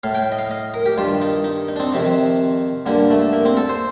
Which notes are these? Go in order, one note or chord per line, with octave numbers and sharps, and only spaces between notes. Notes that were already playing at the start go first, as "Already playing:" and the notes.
A2 F5
G5
D#5
F5
D#5
A#4
G4
G2 D#3 F4
D#4
D#4
D#4
D4
C4
F2 C3 D#3
G2 D3 A#3
A3
A#3
C4
A4
C5